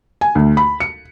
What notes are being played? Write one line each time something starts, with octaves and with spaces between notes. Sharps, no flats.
G#5
D2
B5
C#7